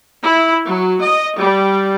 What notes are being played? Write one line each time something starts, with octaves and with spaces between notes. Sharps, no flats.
E4
F#3
D#5
G3